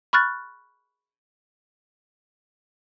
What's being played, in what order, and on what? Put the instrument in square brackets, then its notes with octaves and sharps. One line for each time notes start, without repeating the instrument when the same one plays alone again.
[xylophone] B5 C#6 F6 F#6 A6